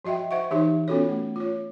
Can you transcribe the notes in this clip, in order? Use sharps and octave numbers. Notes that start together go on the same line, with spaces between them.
F3 F#4 D#5 E5 G5
C5 E5 F#5 C#6
E3 D#4 G4 C5 E5
B3 C#4 F4 F#4 A4 C#5
A3
F4 C#5